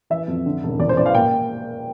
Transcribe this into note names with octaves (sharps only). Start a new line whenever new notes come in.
E3 E5
F2
D3
E1
E2 D5
C5
E3 D5
F5
A#3 G5